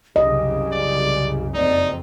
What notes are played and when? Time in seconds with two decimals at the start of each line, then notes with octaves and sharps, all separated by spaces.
0.16 C2 F#2 C#3 G4 D#5
0.72 D5
1.54 F#1 F2 C4 D#4 D5